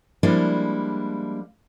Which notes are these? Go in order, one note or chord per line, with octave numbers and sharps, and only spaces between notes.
F3 G3 G#3 A#3 D4 E4